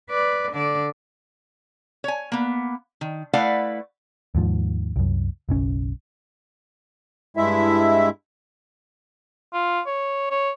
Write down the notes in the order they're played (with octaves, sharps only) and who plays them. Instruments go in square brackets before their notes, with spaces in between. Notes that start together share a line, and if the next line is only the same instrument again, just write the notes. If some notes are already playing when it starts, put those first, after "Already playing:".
[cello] B4 D5
D3 D5
[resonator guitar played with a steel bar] C#5 G#5
A#3 B3
D#3
A3 E4 B4 D5 F5 F#5
[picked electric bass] D#2 G#2 F3
C2 F#2
F#1 B1 C#4
[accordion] G2 G#3 E4 E5
[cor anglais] F4
C#5
C#5